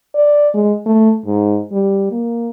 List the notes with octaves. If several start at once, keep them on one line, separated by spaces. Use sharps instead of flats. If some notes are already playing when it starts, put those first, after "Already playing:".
D5
G#3
A3
G#2
G3
A#3